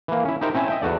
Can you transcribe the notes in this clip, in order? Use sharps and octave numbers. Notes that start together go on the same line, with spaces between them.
E3 A#3
C#4 E4
D#4 E4 G4 A#4 C5
C4 C#4 E4 G#5 A5
D#5 E5 G5
E2 F#4 A4 D5